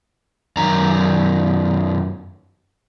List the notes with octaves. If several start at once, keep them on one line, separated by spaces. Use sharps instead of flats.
F#2 D#3 A#5